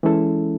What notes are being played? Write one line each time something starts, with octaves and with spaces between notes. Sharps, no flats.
E3 G#3 C#4 E4 A4